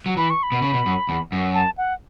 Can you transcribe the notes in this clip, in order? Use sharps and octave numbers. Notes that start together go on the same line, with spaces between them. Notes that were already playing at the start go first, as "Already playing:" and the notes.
F#3
E3 B5
C#6
B5
B2
C#3
B2
F#2
E2
F#2
A5
F#5